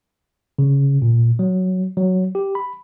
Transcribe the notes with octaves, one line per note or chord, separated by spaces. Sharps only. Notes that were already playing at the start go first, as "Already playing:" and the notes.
C#3
A#2
F#3
F#3
G4
B5